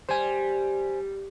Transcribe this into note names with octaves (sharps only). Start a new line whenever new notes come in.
G3 C5 G#5